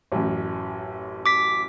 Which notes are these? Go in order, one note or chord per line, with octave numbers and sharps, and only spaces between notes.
A1 F#2
D6 B6